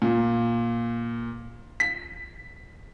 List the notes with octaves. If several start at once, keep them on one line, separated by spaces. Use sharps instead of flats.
A#2
B6